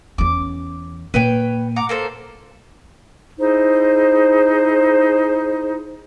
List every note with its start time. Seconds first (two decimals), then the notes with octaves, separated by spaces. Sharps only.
0.18 E2 C#4 D6
1.14 A#2 B4 C#5 G5
1.76 F#5 A#5 D6
1.89 A#3 A4 C5
3.38 D#4 E4 G#4 C5